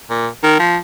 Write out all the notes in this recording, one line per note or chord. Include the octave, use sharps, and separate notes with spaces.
A#2
D#3
F3